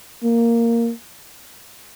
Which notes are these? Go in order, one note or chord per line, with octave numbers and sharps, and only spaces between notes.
A#3